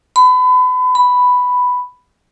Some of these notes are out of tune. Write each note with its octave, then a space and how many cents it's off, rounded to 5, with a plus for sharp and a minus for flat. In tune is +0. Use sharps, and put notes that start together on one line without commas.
B5 +30
B5 +5